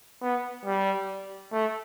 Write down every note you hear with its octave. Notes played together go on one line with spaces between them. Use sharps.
B3
G3
A3